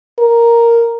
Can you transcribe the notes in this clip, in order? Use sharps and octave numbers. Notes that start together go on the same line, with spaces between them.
A#4